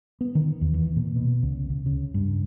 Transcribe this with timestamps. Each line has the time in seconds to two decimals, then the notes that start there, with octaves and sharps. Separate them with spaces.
0.21 B3
0.35 D#3
0.61 E2
0.74 E3
0.96 A#2
1.16 B2
1.43 C#2
1.70 C#2
1.86 C#3
2.14 G2